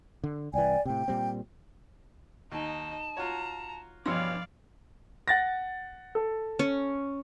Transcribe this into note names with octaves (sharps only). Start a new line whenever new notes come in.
D3
C2 E3 D5 G5 G#5
A2 C3 G5
A#2 G3 C4
D#2 D#4 D#5 A5
F4 F#4 C#5 A#5
G2 B2 E3 F3 C#5 D5 F5 C6
F#5 A6 A#6
A4
C#4